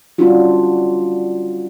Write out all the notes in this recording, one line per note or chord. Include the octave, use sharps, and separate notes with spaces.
G3 C#4 D4 F4 F#4